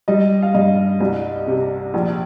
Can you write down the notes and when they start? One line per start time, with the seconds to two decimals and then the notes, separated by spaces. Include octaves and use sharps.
0.08 G3 D#5
0.42 F5
0.54 G2 D#5
1.01 C2
1.47 C3
1.94 A#1